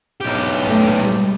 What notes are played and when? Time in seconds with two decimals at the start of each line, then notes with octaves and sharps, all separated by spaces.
0.21 B1 G4
0.62 A3
0.99 G3 G#3